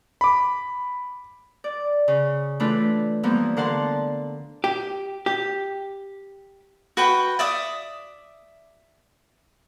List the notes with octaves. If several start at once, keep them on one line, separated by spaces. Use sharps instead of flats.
B5 D6
D5
C#3
E3 A3 D4 F4 B4
E3 F3 G3 A#3 B3
D3 A#4 F5 F#5 A5 C6
G4
G4
F#4 B4 G5 B5
D5 E5 D6 D#6